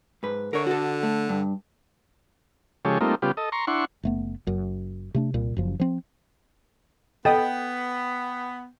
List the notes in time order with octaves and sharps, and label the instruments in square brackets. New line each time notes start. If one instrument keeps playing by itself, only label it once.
[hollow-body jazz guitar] G#2 B4
[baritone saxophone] D3 [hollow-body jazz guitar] A#4 C#5
[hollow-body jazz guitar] F#4 A4
A3
G2
[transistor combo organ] C#3 F3 G#3 G4 A4 C#5
G3 A3 A#3 C4 D#4 F4
C#3 G3 B3 F4 G4
A4 D#5
A#5 C6 C#6
D4 E4 F#5 C6 C#6
[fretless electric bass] F#1 A3 B3
F#1 F#2
C3 A3 D4
C2 A#2 G3
F#1 F#2 F3
F3 C4
[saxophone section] B3 [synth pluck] A4 D#5 [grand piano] G5